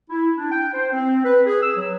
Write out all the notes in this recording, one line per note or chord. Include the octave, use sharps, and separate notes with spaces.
E4
D4
G5
C5
C4
B4
G#4
E6
F#3